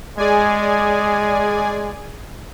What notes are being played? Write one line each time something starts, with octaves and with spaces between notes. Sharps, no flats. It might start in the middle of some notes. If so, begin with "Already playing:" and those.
G#3 G#4 D5 G#5